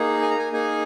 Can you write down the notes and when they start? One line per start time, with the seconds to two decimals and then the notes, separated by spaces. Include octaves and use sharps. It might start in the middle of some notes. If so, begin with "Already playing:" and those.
Already playing: A#3 D#4 G#4
0.22 G#5
0.30 A#5
0.38 G#5
0.52 A#3 D#4 G#4 G#5